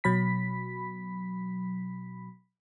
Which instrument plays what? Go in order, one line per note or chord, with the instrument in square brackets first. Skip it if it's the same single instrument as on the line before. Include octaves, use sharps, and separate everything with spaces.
[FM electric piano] B2 F#3 B5 B6